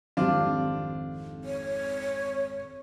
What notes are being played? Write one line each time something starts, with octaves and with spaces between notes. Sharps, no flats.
G#1 F2 C4 D4 F4 G4
C#5